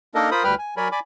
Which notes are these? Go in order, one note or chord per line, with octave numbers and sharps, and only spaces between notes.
A#3 D4 D#4 A4 A#4 D#5
F4 A#4 C5 B5 D#6
D2 G3 B4 G5 B5 F6
G#5
F#3 A#4 C#5 D5 G#5 B5
D5 G#5 B5 D6